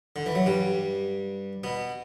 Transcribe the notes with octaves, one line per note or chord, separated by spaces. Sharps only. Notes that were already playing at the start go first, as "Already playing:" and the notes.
D3
E3
F#3
G2 G3
B2 B3